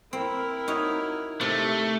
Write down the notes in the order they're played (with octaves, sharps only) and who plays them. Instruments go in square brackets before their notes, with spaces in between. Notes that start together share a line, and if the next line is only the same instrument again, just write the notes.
[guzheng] C4 [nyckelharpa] E4 A#4
[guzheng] D#4 F#4 C#5
[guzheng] C3 [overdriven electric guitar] A3